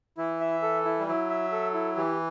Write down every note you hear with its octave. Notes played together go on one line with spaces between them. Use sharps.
E3 E4
E5
A4
E4
G3
F#3 E4
E5
A4
E4
E3 G4